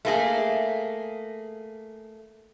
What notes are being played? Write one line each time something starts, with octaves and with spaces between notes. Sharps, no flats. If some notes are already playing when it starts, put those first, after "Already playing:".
A3 A#3 G#4